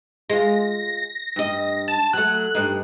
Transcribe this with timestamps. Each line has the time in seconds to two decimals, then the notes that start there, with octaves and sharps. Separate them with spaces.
0.30 G#3 F4 A#6
1.36 G2 D#5
1.88 A5
2.13 F#3 A3 F#6
2.55 G2 D#4